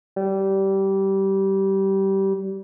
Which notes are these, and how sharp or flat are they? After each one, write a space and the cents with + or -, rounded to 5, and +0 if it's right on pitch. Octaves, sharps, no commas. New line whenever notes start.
G3 -20